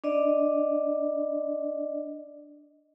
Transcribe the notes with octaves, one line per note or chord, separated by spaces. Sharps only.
D4 D5 D#5